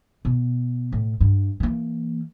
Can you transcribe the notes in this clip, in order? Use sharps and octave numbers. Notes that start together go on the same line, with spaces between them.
B2
A2
G2
E3 A#3